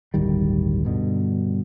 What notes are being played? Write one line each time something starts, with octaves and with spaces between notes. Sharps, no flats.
D1 G1 D#3 G3
G2 B2 D3